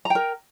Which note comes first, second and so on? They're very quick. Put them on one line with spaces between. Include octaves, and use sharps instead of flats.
A#5 G5 A#4